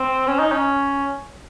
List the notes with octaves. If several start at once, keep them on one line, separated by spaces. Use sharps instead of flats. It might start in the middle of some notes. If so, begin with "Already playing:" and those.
Already playing: C4
C#4
D#4
C#4